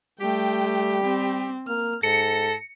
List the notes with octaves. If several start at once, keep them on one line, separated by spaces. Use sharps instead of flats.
G3 A3 G4 G5
C4
A#3 F6
G#2 A4 A#6 C#7